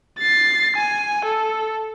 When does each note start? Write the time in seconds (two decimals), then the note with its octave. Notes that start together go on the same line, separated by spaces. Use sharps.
0.18 A6 C7
0.76 G#5
1.25 A4